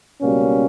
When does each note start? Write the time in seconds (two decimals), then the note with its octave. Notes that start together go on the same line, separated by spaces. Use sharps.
0.21 C#2 B2 G3 A#3 C#4